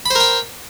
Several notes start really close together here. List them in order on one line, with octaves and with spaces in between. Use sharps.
B5 C5 A#4 G5